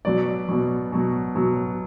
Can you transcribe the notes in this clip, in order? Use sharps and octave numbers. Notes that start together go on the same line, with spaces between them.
B2 F#3 D5
B2 F#3
B2 F#3
B2 F#3